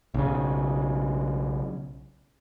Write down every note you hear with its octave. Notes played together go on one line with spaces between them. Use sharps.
B1 C#3